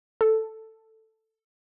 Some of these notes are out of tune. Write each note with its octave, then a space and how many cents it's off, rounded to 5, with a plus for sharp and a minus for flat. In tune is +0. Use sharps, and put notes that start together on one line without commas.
A4 +5